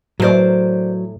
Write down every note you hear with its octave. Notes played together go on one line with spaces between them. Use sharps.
A2 F#3 A#4 C5 D5